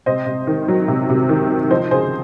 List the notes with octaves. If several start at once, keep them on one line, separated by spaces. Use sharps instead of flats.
C3 C5 D#5
C3
D#3
F#3
C3
C3
D#3
F#3
F3 C5 D#5
C#3 G#4 C5